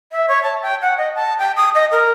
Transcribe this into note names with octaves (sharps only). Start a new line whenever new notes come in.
E5
C#5
A5
G5
F#5
D#5
A5
G5
D#6
D#5
A#4